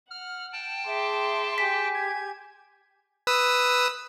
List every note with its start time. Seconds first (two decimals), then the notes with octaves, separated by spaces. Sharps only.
0.11 F#5 F6
0.53 G5 A5
0.87 G#4 E5 C6 D6
1.58 G4 G#5 B6
1.94 G#6
3.27 B4 D#6 E6